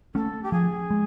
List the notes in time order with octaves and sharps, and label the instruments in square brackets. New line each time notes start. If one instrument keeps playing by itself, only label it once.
[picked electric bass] A3 C#4 [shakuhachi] A4
[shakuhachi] G4
[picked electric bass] F3 [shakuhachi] G#4
[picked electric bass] G#3